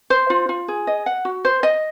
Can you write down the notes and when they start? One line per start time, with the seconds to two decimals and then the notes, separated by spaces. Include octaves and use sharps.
0.10 C5
0.30 F4
0.49 F4
0.68 G#4
0.87 D#5
1.06 F#5
1.25 F#4
1.45 C5
1.63 D#5